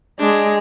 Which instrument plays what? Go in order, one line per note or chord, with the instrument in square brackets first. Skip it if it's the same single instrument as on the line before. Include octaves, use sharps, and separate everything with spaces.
[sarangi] G#3 [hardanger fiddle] D4